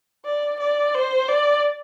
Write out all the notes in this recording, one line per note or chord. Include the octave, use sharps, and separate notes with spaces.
D5
D5
C5
D5